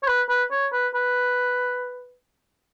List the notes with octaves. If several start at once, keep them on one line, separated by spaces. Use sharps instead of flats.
C#5
B4
B4
C#5
B4
B4